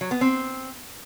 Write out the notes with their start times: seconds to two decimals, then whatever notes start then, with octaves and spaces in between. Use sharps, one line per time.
0.01 F#3
0.11 B3
0.21 C4